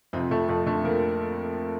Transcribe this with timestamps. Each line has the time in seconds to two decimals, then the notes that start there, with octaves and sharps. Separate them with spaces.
0.13 F2 C3 C4
0.31 F2 A3 A4
0.49 F2 A3 A4
0.66 D3 A3 A4
0.84 F3 A#3 A#4